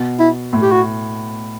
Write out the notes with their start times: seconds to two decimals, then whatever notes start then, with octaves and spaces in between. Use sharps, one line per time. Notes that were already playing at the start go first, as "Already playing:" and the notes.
Already playing: B2
0.19 E4
0.53 A2
0.62 G4
0.72 F#4